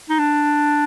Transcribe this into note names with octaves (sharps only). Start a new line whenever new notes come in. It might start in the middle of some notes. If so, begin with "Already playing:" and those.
D#4
D4